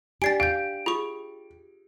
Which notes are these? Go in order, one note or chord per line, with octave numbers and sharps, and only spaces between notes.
D4 G4 D5 G#5 A6 C7 D7
F5 G6 D7
F4 G#4 C#6